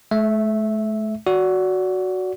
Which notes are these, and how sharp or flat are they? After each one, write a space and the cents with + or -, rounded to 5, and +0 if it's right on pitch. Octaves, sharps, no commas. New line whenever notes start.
A3 -40 E5 -5
F#4 +0 D5 -30